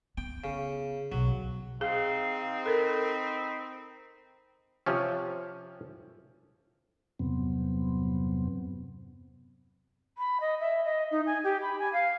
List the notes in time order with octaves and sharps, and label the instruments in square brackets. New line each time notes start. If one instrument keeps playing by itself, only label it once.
[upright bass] B3 [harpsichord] G5
[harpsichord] C#3
[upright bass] B1 [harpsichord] F#3
[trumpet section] C4 D#4 [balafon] G#4 [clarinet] F5
[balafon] A4 A#4 [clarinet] B5
[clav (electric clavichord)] C3 F3 C#4
[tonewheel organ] E2 G2 C3 F#3 B3 C4
[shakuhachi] B5
D#5
E5
D#5
D#4
G#5
G4
B5
G#5
F5